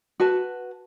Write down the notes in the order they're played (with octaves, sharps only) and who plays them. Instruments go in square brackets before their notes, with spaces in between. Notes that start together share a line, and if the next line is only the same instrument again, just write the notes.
[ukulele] F#4 B4 A5